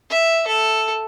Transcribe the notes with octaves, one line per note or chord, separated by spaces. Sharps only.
E5
A4